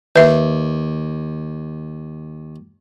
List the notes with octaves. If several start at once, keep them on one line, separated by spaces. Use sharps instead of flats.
D#2 B4 E5